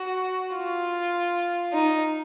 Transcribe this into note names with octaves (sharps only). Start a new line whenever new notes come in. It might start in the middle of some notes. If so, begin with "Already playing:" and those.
Already playing: F#4
F4
D#4